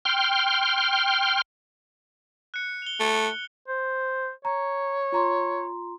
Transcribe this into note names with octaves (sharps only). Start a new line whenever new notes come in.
G5 C6 F6
F#6 C#7
F7 G7
A3
C5
C#5 A#5
F4 A#5 C6